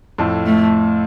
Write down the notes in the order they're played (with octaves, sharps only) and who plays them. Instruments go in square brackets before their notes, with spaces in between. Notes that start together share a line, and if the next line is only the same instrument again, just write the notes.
[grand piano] F2 A2
[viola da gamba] A3